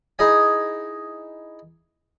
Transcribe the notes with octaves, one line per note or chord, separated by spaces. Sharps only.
D#4 E4 G#4 D#5 G#5